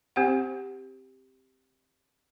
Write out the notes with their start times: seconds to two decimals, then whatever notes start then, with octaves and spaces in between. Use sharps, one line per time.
0.16 C4 G4 C5 F#5